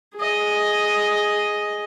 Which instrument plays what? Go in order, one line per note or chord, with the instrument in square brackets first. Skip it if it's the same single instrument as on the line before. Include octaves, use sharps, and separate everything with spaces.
[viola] G#4 D#5